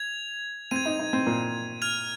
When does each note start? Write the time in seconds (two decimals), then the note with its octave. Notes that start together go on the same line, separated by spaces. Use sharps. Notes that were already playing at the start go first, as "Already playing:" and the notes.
Already playing: G#6 F7
0.71 C4 G#6 D#7
0.86 D#4
1.00 D#4
1.13 C4
1.26 A#2
1.82 F6 G#6 F7